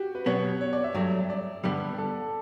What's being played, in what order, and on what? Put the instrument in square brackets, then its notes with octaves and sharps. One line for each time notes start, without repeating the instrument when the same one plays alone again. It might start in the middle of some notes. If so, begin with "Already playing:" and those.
Already playing: [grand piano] F#4 G4
B4
[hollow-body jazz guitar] B2 F#3 B3 [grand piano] C#5
[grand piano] C#5
D5
E5
[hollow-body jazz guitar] G2 F#3 A3
[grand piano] D5
[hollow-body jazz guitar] G2 D3 G3 B3
[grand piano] A4